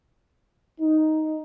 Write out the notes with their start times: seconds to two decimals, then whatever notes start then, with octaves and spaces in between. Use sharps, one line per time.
0.79 D#4